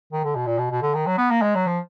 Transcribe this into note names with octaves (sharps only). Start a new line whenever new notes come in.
D#3
D3
B2
A#2
B2
B2
D3
D#3
F#3
B3
A#3
G#3
F#3
F3